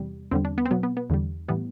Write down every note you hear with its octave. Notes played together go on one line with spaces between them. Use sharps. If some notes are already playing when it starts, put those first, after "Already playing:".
Already playing: E2 C3 G3
E2 D3 G3 C4
D4
B3
C4
B2 F#3 B3
B3
B3
E2 D3 G3
A2 E3 G3 B3